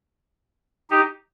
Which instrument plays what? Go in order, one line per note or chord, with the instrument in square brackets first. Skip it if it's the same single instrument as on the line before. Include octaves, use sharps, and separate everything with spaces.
[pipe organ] D#4 G4